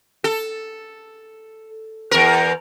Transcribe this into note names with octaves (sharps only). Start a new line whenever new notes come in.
A4
E2 A#4